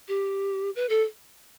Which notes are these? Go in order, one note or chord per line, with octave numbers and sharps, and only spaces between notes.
G4
B4
A4